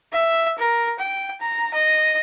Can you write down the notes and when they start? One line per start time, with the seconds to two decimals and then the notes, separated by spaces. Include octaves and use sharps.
0.13 E5
0.58 A#4
0.99 G5
1.41 A#5
1.74 D#5